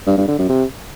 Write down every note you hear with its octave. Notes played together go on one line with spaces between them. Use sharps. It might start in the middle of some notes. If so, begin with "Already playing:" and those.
G2
G2
D3
F#2
C3